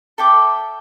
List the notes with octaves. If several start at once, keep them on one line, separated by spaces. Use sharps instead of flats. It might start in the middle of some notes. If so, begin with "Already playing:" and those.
A4 E5 G5 D6